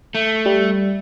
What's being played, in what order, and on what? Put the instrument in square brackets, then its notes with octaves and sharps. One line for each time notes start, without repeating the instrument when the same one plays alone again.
[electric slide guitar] A3
[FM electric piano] G3